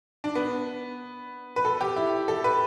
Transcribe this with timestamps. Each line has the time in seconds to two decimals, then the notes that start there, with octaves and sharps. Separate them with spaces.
0.24 D4
0.35 B3
1.56 B4
1.65 A4
1.81 G4
1.96 E4
2.28 A4
2.44 B4